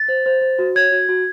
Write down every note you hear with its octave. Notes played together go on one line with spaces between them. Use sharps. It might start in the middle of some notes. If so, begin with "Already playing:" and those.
Already playing: A6
C5
C5
C5
F#4
C#5 G#6
F#4
F#4